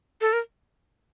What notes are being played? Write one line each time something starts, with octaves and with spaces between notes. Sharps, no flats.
A4
A#4